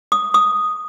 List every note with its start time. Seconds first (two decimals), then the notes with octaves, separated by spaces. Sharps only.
0.12 D#6
0.34 D#6